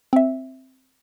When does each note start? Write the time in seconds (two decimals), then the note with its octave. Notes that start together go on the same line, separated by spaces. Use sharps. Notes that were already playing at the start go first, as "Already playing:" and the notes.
0.13 C4 E5